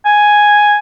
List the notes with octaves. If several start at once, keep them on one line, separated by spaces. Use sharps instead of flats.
G#5